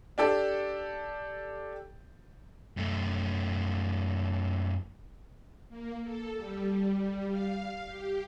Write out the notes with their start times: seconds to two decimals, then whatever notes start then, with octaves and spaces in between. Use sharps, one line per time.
0.18 D4 G4 A4
2.77 F#2 A3
5.69 A#3
6.02 A4
6.37 G3
7.28 F5
7.86 G4